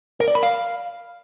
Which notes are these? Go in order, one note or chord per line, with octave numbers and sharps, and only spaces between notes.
A#4
D5
B5
F5